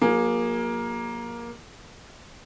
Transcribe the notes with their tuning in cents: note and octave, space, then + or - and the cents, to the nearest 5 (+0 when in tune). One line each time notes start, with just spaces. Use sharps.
F#3 -30 A#3 +15 G#4 +0